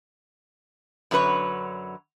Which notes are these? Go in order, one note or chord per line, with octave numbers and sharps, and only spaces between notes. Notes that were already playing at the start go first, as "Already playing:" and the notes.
F#2 D3 F#3 B4 C#5